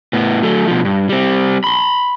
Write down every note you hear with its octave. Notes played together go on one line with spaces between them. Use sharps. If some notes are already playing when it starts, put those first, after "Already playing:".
A2 B3
F#3 A3
B2 F3
G2
G3 C4
B5 C6